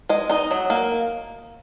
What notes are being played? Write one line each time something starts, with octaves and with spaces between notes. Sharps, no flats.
G#3 D#5
D#4 D#5
F#3
A#3